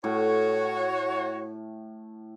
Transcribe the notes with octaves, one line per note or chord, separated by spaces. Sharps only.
A2 F#4 C#5